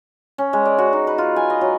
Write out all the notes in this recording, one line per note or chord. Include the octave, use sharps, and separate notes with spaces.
C#4
G#3
D5
F#4
D#4
B4
F4
G#5
D#5
F#3